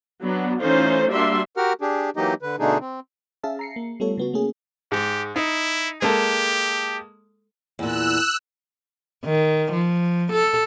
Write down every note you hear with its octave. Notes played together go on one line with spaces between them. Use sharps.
F#3 B3 D4
E3 A3 C#4 D#4 F4 C5
G3 A#3 D4 F#4 E5 C6
F#4 G4 A#4 F#5 F6
D4 G4 G#4
E3 F#3 A#3 D#4 G4 D#5
D3 B4
B2 D3 A3 D4 D#4 G#4
C4
C#4 G#4 E5 F5 A5
A#5 C7 C#7
A#3
G3 A3 B3 F4 A4 C#5
C#3 B3 F#4
A3 A#3 C#4 G#4
G#2 G4
D#4 E4
G#3 A#3 G4 A4
E2 A#2 E6 F#6
D#3
F3
A4